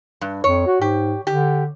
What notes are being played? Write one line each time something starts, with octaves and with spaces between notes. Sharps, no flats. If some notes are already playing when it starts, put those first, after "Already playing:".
G2
F2 C#5
F#4
G#2 G4
D3 G4